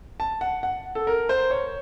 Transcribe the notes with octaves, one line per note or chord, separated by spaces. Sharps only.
A5
F#5
F#5
A4
A#4
C5
C#5